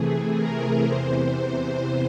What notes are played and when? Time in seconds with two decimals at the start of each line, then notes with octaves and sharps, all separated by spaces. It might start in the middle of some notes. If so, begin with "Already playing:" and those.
Already playing: C3 E3 A3 G#4
0.36 A#4
0.83 E2 C3 E3 C5